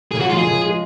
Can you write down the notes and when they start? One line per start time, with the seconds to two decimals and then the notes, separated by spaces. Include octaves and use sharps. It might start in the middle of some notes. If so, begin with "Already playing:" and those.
0.12 C#3 G#4
0.21 F#4
0.29 F3 G#3 F4
0.38 G#4
0.47 C#3
0.64 F3 G#3